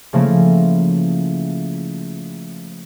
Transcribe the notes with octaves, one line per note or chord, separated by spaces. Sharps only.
C#3 F3 A3 A#3 E4